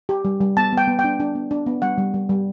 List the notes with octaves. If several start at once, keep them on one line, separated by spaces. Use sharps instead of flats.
G4
G3
G3
B3 A5
B3 G5
B3
G5
D4
D4
B3
D4
B3
G3 F#5
G3
G3
G3